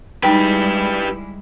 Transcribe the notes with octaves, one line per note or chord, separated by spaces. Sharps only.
G3 G#3 D#4 E4 G4 B4 G5